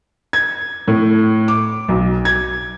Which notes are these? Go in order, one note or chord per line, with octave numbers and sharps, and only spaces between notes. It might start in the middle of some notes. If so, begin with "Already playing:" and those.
G#6
A2
D6
B1
G#6